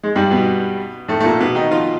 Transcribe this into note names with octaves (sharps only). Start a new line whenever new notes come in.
G#3
G2 G3
B2 B3
A2 A3
A3
A#2 A#3
B2 B3
D#3 D#4
F3 F4